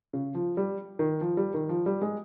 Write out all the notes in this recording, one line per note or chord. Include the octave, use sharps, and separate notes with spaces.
C#3
F3
G3
D#3
F3
G3
D#3
F3
G3
G#3